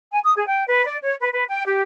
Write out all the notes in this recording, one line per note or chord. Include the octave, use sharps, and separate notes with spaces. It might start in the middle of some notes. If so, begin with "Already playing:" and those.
G#5
D#6
G#4
G5
B4
D5
C#5
B4
B4
G5
G4